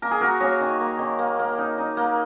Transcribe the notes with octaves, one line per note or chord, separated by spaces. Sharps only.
A#3 A#4
G#4
A#3 F#4 A#4
A#3 G#4 C#5
D#3
A#3
D#3
A#3
A#3
D#4
D#4
A#3